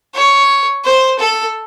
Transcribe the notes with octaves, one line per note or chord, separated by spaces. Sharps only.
C#5
C5
A4